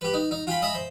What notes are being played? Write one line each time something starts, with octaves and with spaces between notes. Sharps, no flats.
G4 B4
D#4
D#4
F4 G5 G#5 B5
D#5 E5 G#5 A#5 B5
C5